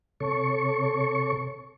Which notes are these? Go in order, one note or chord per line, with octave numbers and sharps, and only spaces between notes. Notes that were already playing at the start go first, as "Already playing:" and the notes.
C3 A4 C#5 C#6